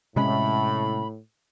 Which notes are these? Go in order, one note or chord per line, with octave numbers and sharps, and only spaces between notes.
A2 C3 G#3 C#4 B5